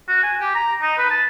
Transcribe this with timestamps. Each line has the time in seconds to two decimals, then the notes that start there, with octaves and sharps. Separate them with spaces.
0.08 F#4
0.23 G#5
0.40 G4
0.55 A#5
0.82 D#4
0.98 B4
1.10 A5